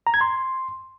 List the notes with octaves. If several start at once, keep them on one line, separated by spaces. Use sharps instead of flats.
A#5
G#6
C6